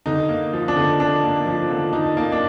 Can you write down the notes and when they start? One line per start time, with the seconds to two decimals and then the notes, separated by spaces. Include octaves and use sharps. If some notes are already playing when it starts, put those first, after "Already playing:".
0.06 D3 D#4
0.29 A#3
0.53 F3
0.68 D4
0.77 D3
1.00 D3 D4
1.23 A#3
1.46 F3
1.70 D3
1.93 D3 D#4
2.17 A#3 D#4
2.32 D4